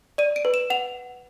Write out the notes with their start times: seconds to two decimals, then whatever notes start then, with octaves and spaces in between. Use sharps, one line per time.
0.18 D5 D#7
0.36 D7
0.45 B4
0.54 E7
0.70 F#5 F7